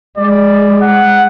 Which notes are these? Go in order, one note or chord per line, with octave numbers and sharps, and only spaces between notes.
G#3 D5
F#5